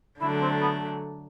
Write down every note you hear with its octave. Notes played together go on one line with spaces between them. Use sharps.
D3 F#3 A3 D4 E4
C4
B3